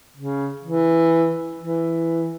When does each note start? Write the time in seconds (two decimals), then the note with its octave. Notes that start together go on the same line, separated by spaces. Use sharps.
0.17 C#3
0.64 E3
1.60 E3